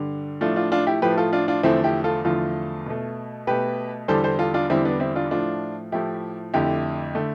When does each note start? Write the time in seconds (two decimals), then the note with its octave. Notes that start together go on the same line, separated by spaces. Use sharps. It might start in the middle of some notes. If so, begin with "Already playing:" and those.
Already playing: G2 D3 G3
0.41 A2 F3 A3 D4 F4
0.56 D4 F4
0.72 D4 F4
0.87 E4 G4
1.02 A2 F3 A3 G4 B4
1.17 F4 A4
1.33 D4 F4
1.48 D4 F4
1.63 E2 D3 F3 A3 C4 E4
1.84 E4 G4
2.04 F4 A4
2.24 E2 D3 F3 A3 F4 A4
2.86 B2 A3
3.47 B2 A3 G4 B4
4.08 E2 D3 G3 A4 C5
4.24 A4 C5
4.39 F4 A4
4.54 D4 F4
4.70 E2 D3 G3 C4 E4
4.85 B3 D4
5.00 C4 E4
5.16 D4 F4
5.31 A2 F3 A3 D4 F4
5.92 A2 F3 A3 E4 G4
6.54 F2 D3 A3 E4 G4
7.15 D3 A3